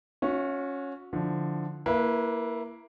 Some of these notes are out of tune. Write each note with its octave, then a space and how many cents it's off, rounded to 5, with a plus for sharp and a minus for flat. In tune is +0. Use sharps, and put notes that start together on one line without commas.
C#4 +0 F#4 -35 E5 +0
D3 +0 F3 +0 E4 +0
A#3 +0 E4 +10 B4 -25